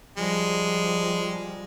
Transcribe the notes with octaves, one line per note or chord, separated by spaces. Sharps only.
F3 G3 G#3